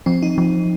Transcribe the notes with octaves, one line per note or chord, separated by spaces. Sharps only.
F3 C4
D#4
F3